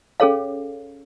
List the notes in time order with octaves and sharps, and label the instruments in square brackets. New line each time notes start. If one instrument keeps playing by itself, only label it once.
[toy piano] C#4 G#4 A4 C#5 F5